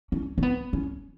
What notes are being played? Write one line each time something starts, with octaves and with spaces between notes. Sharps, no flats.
C#4
C#4
B3
C#4